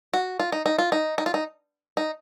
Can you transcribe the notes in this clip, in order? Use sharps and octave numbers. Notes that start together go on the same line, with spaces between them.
F#4
F4
D#4
D#4
F4
D#4
D#4
F4
D#4
D#4